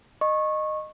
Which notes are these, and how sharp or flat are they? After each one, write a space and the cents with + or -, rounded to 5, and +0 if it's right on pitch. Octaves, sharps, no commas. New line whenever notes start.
D#5 -15 C#6 -20